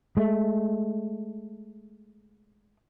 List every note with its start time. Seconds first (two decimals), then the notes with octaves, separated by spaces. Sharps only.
0.17 G#3 A3